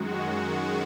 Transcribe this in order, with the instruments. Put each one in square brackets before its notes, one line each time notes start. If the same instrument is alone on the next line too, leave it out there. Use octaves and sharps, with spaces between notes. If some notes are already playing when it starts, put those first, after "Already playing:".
Already playing: [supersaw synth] F#2 D#3 G#3 F#4